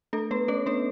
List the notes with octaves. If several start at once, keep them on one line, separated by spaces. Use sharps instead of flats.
A3 D4 A4
A3 B3 B4
A3 C#4 C#5
B3 D4 B4